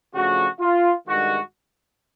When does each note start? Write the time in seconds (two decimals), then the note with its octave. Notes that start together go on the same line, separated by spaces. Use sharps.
0.14 C#3 F3 A3 D4 F#4
0.60 F4
1.06 G2 D#3 G#3 F#4